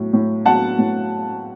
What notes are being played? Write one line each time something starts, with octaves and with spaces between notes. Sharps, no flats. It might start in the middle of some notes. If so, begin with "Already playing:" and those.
Already playing: A2 F#3
A2
F#3 F#5 A5
A2